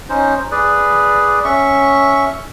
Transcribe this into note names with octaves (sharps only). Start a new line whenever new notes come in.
C#4 D#4 C5
G#4 B4 D5
C#4 E5 C#6